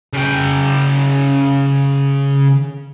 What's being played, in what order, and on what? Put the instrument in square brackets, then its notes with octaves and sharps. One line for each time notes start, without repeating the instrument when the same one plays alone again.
[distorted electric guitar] C#3 G5